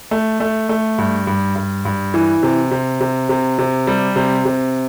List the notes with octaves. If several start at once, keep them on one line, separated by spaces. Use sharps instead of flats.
A3
A3
A3
G2
G2
G2
G2
E3
C3
C3
C3
C3
C3
G3
C3
C3